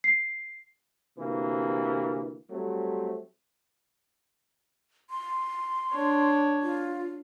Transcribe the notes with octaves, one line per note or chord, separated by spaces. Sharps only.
C7
D2 C3 E3 A#3
F#3 G3 A3 C4
C6
D4 C#5
F4